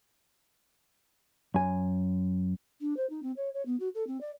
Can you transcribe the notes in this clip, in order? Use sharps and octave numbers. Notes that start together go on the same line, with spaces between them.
F#2 G#5
D4
C5
D#4
C4
C#5
C#5
B3
F#4
A4
C4
D5